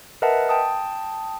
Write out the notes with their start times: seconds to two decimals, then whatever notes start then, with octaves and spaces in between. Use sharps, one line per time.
0.22 A#4 B4 D#5 E5 F#5 A5
0.49 G5 A5 D#6